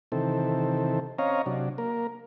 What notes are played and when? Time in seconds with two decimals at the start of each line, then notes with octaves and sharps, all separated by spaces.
0.12 C3 D#3 E3 C4 A4
1.18 C4 C#4 C#5 D#5 F5 A#5
1.46 C3 F#3 D4
1.78 A#3 A#4